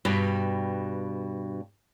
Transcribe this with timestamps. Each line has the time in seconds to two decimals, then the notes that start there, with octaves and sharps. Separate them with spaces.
0.05 G2 B2 G3